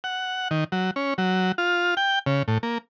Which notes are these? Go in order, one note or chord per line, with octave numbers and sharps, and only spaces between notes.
F#5
D#3
F#3
C#4
F#3
F4
G5
C#3
A2
A#3